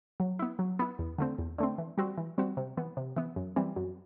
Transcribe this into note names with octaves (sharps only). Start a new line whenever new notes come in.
F#3
B3 E4
F#3
B3 E4
E2
D3 A3 C4
E2
D3 A3 C4
E3
G3 C4 F#4
E3
G3 C4 F#4
C3
E3 B3
C3
E3 B3
F#2
E3 G3 C4
F#2